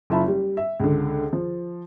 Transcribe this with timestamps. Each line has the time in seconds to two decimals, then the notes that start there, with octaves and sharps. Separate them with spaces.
0.10 F#1 F4 E5 A5 B5
0.28 G3
0.57 E5
0.80 C#2 D3
1.33 F3